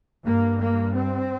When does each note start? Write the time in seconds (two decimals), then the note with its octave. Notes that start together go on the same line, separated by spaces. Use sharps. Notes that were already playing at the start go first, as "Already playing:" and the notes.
0.24 G2 A#3
0.59 A#3
0.95 C4